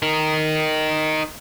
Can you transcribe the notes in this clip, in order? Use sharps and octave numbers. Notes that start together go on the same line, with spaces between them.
D#4 A#4